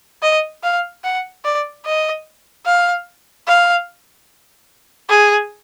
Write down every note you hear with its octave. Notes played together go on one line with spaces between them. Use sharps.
D#5
F5
F#5
D5
D#5
F5
F5
G#4